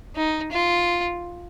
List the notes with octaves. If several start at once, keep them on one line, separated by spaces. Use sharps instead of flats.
D#4
F4